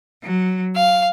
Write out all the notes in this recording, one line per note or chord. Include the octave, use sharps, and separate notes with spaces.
F#3
F5